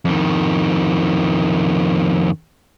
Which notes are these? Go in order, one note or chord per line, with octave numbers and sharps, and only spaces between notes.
F2 D#3